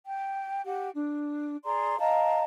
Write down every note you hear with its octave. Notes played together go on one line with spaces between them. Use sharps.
G5
G4 F#5
D4
G#4 D5 A#5 C6
D#5 F5 A5 A#5